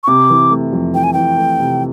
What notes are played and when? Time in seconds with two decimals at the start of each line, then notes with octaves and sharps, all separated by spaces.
0.04 C#6
0.07 C3 D6
0.30 E3
0.51 A3
0.73 F2
0.94 E3 G5
1.04 G#5
1.13 E3 G5
1.37 A3
1.59 C3